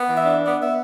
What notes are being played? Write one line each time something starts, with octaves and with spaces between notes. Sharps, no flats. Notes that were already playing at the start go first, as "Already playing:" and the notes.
Already playing: B3
E3
E5
D4
B3 D5
B3 E5